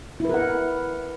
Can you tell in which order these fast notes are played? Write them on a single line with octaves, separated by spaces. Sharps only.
E4 B4 A#4 F#5